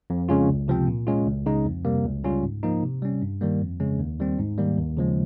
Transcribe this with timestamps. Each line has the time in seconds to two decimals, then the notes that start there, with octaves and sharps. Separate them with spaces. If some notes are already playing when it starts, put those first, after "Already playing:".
0.10 F2
0.29 C#3 G#3 C#4 F4
0.49 C#2
0.68 C3 F3 C4
0.87 A#2
1.07 G#3 C#4 F4
1.27 C#2
1.46 C#3 G#3 D#4
1.65 F2
1.85 C3 G3 A#3
2.05 C#2
2.24 C#3 G3 C#4 F4
2.43 G#2
2.63 F3 A#3 D#4
2.83 C3
3.02 G3 C#4
3.22 G2
3.41 D#3 G3 A#3
3.61 F2
3.80 C#3 G#3 C#4
3.99 D#2
4.20 D#3 G3 C4
4.39 G#2
4.58 D#3 G3 A#3
4.78 D#2
4.97 C#3 F3 G#3